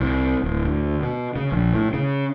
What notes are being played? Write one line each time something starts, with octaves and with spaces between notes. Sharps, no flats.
C2
D1
D2
B2
C#3
A#1
A2
C#3